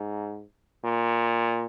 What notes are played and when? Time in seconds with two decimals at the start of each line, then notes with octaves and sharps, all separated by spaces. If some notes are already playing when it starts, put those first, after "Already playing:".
Already playing: G#2
0.84 A#2